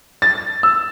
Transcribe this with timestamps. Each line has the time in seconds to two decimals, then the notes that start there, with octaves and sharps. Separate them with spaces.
0.22 A6
0.63 E6